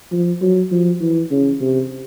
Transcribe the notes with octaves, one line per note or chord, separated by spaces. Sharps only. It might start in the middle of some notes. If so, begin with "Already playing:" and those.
F3
F#3
F3
E3
C#3
C3